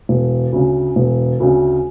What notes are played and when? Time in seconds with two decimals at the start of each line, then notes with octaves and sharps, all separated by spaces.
0.09 E1
0.52 D2 C#3
0.96 E1
1.40 D2 C#3